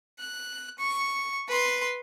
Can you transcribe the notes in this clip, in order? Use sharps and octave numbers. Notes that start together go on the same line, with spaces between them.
F#6
C#6
B4 C6